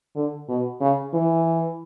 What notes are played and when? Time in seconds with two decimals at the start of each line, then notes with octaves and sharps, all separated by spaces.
0.16 D3
0.49 B2
0.81 C#3
1.13 E3